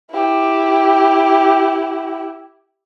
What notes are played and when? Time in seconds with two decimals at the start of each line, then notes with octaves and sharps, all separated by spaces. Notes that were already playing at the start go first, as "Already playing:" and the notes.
0.11 E4 G4